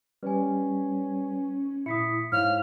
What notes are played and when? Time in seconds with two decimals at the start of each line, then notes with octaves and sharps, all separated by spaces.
0.23 G3 C#4 B4 G#5
1.86 A#2 E4 D#6 B6 C#7
2.32 G#2 E4 C5 C#5 F5 F6